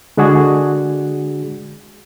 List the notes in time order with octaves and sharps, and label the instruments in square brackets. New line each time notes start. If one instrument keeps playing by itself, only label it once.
[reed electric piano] D3 G#3 D4 F#4 G#4